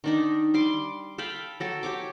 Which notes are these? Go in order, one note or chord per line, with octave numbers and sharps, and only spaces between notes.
D#3 D4 D#4
G3 C6 D6
A4 F5 G5 B5
F#3 A4 G5
G4 C#5 D6